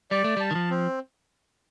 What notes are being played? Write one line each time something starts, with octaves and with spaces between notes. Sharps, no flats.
G3 D5
A3
G3 A5
D#3
F3
C4